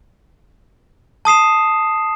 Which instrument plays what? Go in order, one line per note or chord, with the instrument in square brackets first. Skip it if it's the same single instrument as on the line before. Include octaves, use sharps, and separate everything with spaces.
[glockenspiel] A5 D#6 C7 E7